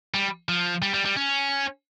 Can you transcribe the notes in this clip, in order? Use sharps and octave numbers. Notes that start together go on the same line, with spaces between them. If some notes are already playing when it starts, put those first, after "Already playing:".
G3
F3
G3
G3
G3
C#4